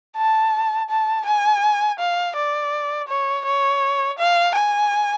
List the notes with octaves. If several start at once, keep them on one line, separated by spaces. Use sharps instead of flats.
A5
A5
G#5
F5
D5
C#5
C#5
F5
G#5